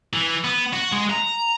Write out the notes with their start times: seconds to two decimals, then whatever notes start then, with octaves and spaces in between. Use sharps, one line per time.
0.13 E3
0.44 B3
0.73 F#4
0.93 G#3
1.10 A#5